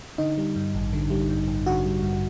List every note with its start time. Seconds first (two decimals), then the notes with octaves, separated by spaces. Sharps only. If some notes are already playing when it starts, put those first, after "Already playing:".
0.18 D3 D#4
0.38 G3
0.56 G2
0.75 A1
0.93 D3
1.10 G3
1.29 G2
1.47 A1
1.66 D3 F#4
1.85 G3
2.03 G2